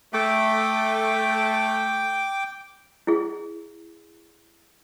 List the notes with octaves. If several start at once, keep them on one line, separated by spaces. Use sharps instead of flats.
A3 G5 D6
E4 G#4